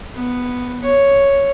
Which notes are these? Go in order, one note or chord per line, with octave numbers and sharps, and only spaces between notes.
B3
C#5